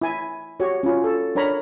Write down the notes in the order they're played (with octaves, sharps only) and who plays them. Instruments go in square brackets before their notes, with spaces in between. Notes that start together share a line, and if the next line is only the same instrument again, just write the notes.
[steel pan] E4 G#5
F#4 G4 C#5
C#4 F4
A4
D4 A#4 C#5 A#5 B5